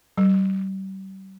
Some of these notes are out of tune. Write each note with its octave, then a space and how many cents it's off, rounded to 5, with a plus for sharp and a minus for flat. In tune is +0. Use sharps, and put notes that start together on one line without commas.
G3 -35